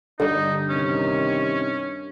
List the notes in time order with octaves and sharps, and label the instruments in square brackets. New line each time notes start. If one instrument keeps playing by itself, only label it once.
[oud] G2 [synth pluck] D3 G3 [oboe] D#4
[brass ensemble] C3 D#3 [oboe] C#4